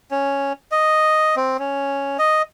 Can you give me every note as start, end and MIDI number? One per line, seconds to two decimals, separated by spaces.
0.11 0.53 61
0.72 1.35 75
1.36 1.57 60
1.59 2.17 61
2.19 2.42 75